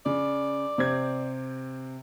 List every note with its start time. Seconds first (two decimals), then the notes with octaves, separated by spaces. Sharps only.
0.06 C#3 D5
0.78 C3 C4 G#6